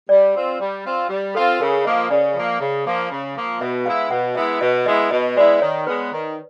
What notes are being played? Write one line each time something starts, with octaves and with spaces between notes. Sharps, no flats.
G3 D5
C4 F4
G3
C4 F4
G3
C4 F4 A4
C#3 A#4
F3 A#3 D#5
C#3 D5
F3 A#3
C#3
F3 A#3
C#3
F3 A#3
B2 E5
G#3 B3 E4 F5
B2 F#5
G#3 B3 E4 E5
B2 D#5
G#3 B3 E4 D#5
B2 D#5
G#3 B3 E4 D5
D#3 C#5
G#3 B3 B4
D#3